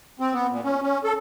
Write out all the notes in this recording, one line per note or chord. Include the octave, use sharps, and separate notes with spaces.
C4
B3
A#2
C#4
C#4
A4